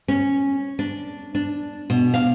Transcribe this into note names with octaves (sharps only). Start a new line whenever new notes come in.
C#4
D4
D4
B2
F5